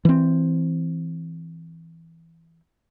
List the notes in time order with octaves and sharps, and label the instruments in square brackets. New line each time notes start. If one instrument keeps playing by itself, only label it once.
[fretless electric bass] E3 C4